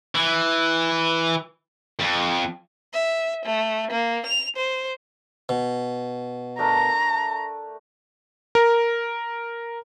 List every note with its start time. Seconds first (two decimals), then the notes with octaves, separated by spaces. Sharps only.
0.15 E3
1.99 F2
2.93 E5
3.45 A3
3.91 A#3
4.26 F7
4.56 C5
5.49 B2
6.59 A3 D4 A#4 A#5
8.55 A#4